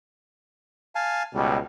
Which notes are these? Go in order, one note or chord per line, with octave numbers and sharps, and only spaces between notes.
F5 G#5 A5
C#2 B2 G3